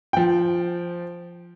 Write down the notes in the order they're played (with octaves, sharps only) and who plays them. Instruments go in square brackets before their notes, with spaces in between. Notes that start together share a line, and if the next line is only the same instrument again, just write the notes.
[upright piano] F3 G5